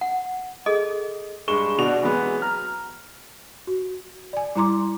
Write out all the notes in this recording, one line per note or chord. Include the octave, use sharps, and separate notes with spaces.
F#5
G#4 A4 D#5
G2 G#3 C#6 E7 G7
B2 D4 F#4 F7
E3 F#3 G#3 B3
A#5 F6
F#4
D5 G#5
G3 E4 A#5 C6 D6